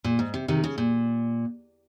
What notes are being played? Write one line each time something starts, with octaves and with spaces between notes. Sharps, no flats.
A#2
G#2
C3
C3 D#3
C#3
A#2